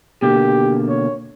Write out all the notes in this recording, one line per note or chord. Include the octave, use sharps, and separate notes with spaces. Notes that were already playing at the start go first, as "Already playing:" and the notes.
B2 D3 A#3 G4
C#5